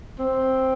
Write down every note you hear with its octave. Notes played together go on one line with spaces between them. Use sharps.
C4